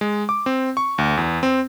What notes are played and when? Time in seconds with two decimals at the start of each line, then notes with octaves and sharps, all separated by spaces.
0.01 G#3
0.29 D6
0.46 C4
0.77 C#6
0.98 D2
1.17 E2
1.43 C4